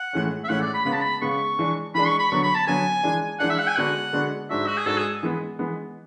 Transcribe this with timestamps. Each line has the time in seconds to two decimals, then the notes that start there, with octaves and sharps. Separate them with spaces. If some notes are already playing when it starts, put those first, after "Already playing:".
Already playing: F#5
0.13 A2 E3 G#3 C#4
0.44 E5
0.49 A2 E3 G#3 C#4 F#5
0.61 D5
0.74 B5
0.85 C#3 G#3 B3 B5
0.93 A5
1.01 B5
1.22 C#3 G#3 B3 C#6
1.59 E3 G#3 D4
1.95 E3 G#3 D4 B5
2.07 C#6
2.19 B5
2.31 D3 F#3 B3 C#6
2.43 B5
2.55 A5
2.67 D3 F#3 B3 G#5
3.03 E3 G#3 D4
3.40 E3 G#3 D4 F#5
3.50 E5
3.59 F#5
3.68 G#5
3.76 D3 G#3 B3 D4 F#4 F#5
4.13 D3 G#3 B3 D4 F#4
4.50 G#2 G#3 D4 F#4 E5
4.67 F#4
4.77 G#4
4.86 G#2 G#3 D4 F#4 A4
4.98 G#4
5.23 E3 G#3 B3
5.59 E3 G#3 B3